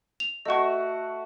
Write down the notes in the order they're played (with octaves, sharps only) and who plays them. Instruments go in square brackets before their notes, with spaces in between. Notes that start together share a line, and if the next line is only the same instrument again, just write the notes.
[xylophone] F7
[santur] A3 F#4 [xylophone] D#5 C#6